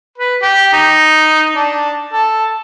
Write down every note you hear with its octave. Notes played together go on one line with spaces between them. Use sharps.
B4
G4
D#4
D4
A4